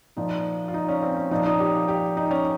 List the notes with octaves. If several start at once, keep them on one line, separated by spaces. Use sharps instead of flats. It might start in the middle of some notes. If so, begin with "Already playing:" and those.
A#2 F3 D#4
F4
D#4
C#4
C4
C#4
A#2 F3 D#4
D#4
G4
G4
D#4
C#4